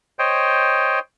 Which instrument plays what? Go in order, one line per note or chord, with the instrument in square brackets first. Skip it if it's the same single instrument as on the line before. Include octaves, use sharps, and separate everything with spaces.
[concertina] C5 C#5 D#5 G5